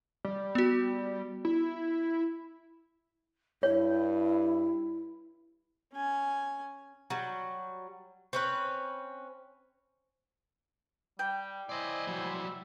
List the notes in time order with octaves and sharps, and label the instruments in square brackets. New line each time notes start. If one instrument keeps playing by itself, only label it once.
[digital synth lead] G3
[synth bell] B3 F#4
[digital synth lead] E4
[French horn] G2 [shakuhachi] E4 [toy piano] C#5
[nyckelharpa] C#4 G#5
[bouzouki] F#3 G3
C4 C#4 B4
[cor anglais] G3 [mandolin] G5
[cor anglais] E4 [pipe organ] C5 G#5 C6 [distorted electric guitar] D5 D#5
[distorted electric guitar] F#3 G3